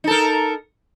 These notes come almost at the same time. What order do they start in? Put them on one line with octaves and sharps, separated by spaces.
D#4 A4 A#4